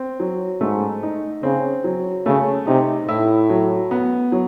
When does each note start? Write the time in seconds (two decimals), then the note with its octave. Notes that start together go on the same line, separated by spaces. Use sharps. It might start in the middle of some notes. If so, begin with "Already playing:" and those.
Already playing: C4
0.20 F#3
0.61 G#2 A3
1.03 D#4
1.43 C#3 C4
1.84 F#3
2.26 C#3 A3
2.67 C3 D#4
3.09 A2 E4
3.50 F#3
3.91 B3
4.32 F#3